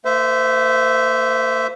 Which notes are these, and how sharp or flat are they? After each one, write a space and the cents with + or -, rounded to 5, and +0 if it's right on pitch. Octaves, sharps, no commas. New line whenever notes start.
A#3 -40 C5 -30 E5 +0